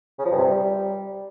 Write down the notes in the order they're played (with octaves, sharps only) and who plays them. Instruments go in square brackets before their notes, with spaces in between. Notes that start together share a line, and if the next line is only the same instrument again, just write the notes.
[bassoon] C#3
F3
G2
C3
G3